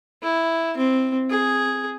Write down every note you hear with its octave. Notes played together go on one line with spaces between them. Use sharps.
E4
C4
G#4